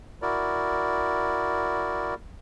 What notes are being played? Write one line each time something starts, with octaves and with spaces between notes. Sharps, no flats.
E4 F#4 A#4 D5